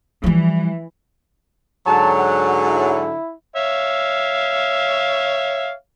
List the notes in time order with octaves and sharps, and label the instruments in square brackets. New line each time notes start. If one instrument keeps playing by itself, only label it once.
[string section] E3 [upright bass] F3 G3
[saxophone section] G#2 D3 F#3 [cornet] A5
[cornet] F#5
E4
[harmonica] C#5 E5 F5